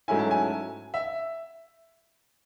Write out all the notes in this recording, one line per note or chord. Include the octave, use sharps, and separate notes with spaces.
G#2 F#3 A3 C#4 E4 G#5
A5
G#5
E5